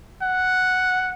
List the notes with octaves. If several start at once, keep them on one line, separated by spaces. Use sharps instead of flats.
F#5